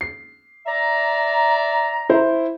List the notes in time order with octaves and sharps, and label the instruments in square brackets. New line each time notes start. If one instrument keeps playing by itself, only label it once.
[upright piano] C7
[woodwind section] D5 E5 A#5
[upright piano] E4 C5